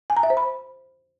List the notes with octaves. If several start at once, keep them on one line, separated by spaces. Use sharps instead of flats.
G#5
A#5
E5
C5
B5